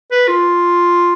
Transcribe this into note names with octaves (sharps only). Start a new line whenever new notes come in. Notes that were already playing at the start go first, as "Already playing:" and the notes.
B4
F4